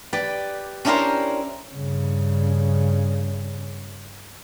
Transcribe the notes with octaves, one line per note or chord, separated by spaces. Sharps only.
G4 B4 D5
C#4 D4 E4 G4 A#4 C5
G2 C#3